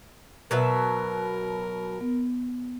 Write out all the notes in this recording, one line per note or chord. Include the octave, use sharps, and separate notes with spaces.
B2 F#3 A#4 B4 E5
B3